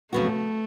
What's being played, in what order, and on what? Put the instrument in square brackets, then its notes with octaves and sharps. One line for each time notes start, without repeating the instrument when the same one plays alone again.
[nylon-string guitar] F2 C#3 F#3 B3 F#4 [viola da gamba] A3